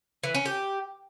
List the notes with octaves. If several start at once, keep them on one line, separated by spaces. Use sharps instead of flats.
E3
C#4
G4